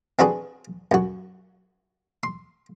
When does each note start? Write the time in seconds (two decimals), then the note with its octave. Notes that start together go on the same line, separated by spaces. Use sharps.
0.19 C4 D4 F#4 G#4 B4
0.91 F#2 F#4
2.23 C6